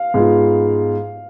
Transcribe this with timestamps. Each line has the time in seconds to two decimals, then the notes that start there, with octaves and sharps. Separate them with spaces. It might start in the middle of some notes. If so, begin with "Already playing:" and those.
Already playing: F5
0.14 G#2 G#3 B3 F4